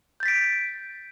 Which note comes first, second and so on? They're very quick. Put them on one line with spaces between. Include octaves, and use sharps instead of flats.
G6 A6 B6 D7